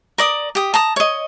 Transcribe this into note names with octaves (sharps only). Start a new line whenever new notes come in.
A#4 D5 D#6
G4 D#6
A5 A#5 D#6
C#5 D#5